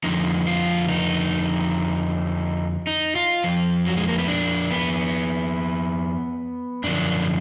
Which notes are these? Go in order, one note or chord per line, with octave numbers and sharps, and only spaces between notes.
F2 D3 F3 D#4
F4
D#4
D#4
F4
F2 F3
F#3
G#3
A#3
B3
D4
B3
F#2 D3 F3 D4